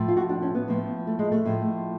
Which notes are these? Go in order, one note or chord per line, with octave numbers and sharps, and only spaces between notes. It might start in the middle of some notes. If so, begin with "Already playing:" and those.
Already playing: A2 F3
F4
F#4
D4
C#4
B3
A2 F3
A3
G#3
A3
A2 F3